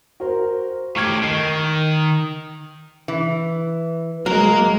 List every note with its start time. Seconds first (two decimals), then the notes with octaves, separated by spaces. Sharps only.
0.20 F#4 A#4 C5
0.96 A2 G4 C#6 F6 G#6
1.23 D#3 C7
3.08 E3
4.26 F#3 G#3 A#3 A#4